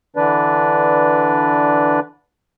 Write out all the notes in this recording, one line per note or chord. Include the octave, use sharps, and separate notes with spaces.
D3 E3 D4 B4 D5